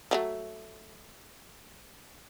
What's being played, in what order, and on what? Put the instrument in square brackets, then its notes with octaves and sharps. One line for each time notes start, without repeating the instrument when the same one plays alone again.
[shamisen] F3 F#3 A3